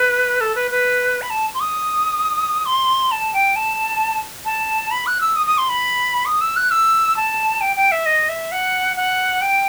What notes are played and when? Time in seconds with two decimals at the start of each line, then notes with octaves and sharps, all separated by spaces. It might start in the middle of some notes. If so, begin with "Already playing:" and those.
Already playing: B4
0.41 A4
0.55 B4
0.71 B4
1.22 B5
1.30 A5
1.54 C6
1.60 D#6
2.66 C6
3.11 A5
3.34 G5
3.56 A5
4.45 A5
4.91 B5
5.07 F#6
5.21 E6
5.36 D#6
5.47 D#6
5.58 C6
5.69 B5
6.26 D#6
6.41 E6
6.56 F#6
6.71 E6
7.17 A5
7.61 G5
7.77 G5
7.92 E5
8.06 D#5
8.29 E5
8.52 F#5
8.97 F#5
9.42 G5